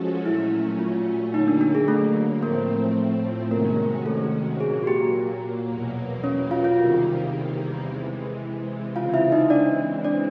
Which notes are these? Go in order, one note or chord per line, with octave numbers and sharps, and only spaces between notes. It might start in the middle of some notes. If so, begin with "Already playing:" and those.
Already playing: F3 G#3 C#4 F#4 A4
A#2 F#3 A3 C#4 E4
F4
D3 F#3 A#3 D#4
D4
D4
G#4
A3 A4
A2 F3 A3 A#3 C4 A#4
C3 D#3 G#3 A#3 C#4 F#4 A#4
A3 A4
A#2 F#3 A#3 G#4
F#4
G4
E2 B2 F#3 A#3
C#4 C#5
F4 F5
F4 F5
E2 C3 D#3 G3 A#3
C3 E3 G#3
C#3 E3 G#3 C4 F4 F5
E4 E5
D#4 D#5
D4 D5
D4 D5